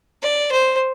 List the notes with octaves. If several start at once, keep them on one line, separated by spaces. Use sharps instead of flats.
D5
C5